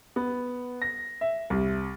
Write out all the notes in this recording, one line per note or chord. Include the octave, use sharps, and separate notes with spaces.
B3
A#6
E5
C2